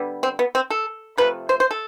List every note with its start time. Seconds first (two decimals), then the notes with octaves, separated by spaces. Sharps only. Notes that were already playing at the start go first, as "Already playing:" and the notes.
Already playing: D3 G3 B3
0.23 C4
0.39 B3
0.55 C4
0.70 A4
1.18 C3 F3 A3 B4
1.49 C5
1.60 C5
1.71 A4